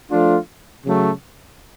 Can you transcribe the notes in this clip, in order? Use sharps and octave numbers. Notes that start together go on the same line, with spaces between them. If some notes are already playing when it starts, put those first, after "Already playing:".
F3 A3 D4 F4
C#3 F#3 A3